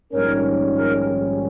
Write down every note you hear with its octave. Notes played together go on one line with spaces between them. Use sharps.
A#1 G#2 D#3 G3 C#4 A#4 C#5
A#4